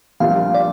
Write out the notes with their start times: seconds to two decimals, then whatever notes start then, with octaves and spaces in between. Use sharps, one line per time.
0.20 A#1 A#2 G3 D4 F5
0.55 D5